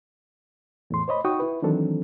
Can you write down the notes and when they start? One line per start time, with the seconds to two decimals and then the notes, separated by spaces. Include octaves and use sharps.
0.90 E2 A2 C6
1.08 C5 C#5 D#5 B5
1.25 D#4 F#4 G5 C#6 D#6
1.40 E4 B4
1.62 D#3 E3 F#3 C4 D4 A4